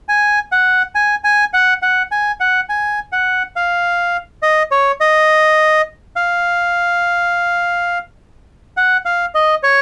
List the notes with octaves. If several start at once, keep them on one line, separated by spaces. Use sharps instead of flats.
G#5
F#5
G#5
G#5
F#5
F#5
G#5
F#5
G#5
F#5
F5
D#5
C#5
D#5
F5
F#5
F5
D#5
C#5